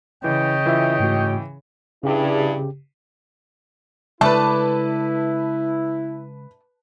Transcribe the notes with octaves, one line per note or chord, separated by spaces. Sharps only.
C#3 E3 C#5 D#5 G5
E3 F4 E5
G#2 A3 F#4
G2 C#3 E4 G4 G#4
C#3 G#3 A3 D4 E4 B4 A5